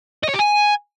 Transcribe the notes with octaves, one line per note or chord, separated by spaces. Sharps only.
D#5
C#5
G4
G#5